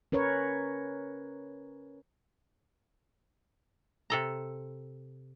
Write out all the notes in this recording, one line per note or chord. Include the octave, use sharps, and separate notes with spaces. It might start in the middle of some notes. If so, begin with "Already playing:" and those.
C#4 A#4 B4 C#5
C3 A4 A#5